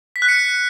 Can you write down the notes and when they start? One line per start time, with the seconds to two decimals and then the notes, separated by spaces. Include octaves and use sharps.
0.16 B6
0.22 F#6
0.28 C#7